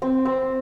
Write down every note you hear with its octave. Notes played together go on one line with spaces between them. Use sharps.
C4
C4